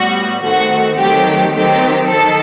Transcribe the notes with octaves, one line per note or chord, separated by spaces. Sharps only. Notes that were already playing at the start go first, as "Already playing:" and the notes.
Already playing: A2 G3 B3 F#4
D#3 A3 C4 F#4
D#3 F#3 A3 C4 G4
D#3 F#3 C4 G4
D#3 A4